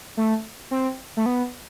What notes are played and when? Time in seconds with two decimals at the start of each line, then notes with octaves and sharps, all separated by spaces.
0.17 A3
0.71 C4
1.17 A3
1.26 B3